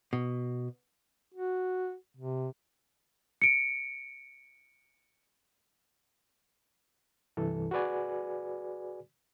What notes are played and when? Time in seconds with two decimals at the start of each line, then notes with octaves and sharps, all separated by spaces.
0.13 B2
1.34 F#4
2.17 C3
3.42 C#7 D7
7.37 C2 G2 E3 A4
7.71 F#4 G#4 B4 D5 G#5